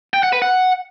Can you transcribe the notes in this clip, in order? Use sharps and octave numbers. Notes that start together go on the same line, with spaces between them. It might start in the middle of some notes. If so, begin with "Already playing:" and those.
G5
F#5
B4
F#5